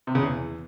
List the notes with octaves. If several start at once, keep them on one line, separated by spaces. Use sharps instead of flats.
C3
C#3
E2